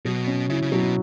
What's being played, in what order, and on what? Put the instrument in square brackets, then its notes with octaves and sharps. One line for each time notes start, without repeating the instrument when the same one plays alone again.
[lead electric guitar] B2 [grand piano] F#3
[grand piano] C#4
[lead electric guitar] C#3 [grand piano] E4
[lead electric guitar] C#3
[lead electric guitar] B2 [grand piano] F#3